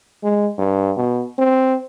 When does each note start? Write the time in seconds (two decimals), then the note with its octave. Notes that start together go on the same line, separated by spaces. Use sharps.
0.23 G#3
0.59 G2
0.97 B2
1.39 C4